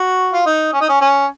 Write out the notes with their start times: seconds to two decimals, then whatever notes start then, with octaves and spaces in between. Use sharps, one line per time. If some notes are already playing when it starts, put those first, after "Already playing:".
Already playing: F#4
0.33 F4
0.46 D#4
0.73 C#4
0.81 D#4
0.89 C#4
1.01 C#4